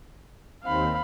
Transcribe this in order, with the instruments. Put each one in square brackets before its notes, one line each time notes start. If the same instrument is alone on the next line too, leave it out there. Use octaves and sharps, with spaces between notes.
[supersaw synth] D#2 C4 [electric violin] F5 B5